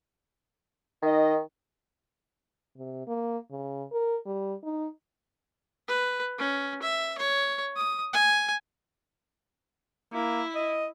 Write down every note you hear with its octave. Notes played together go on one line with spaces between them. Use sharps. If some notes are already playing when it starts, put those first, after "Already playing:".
D#3 D#4 D#5
C3
A#3
C#3
A#4
G3
D#4
B4
C#4
E5
C#5
D#6
G#5
A#3 E4
D#5